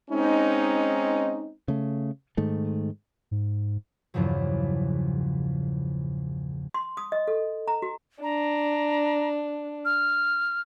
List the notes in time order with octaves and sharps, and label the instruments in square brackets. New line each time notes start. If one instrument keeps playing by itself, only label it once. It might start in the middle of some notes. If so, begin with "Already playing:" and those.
[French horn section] G#3 C4 C#4 D#4
[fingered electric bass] C#3 A3
G#2 D#3 A3
[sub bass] G#2
[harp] A#1 E2 G2 C#3 F3 F#3
[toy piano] C6
D#6
D#5
A4
A#5
F#4
[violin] D4 [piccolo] A#5
[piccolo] F6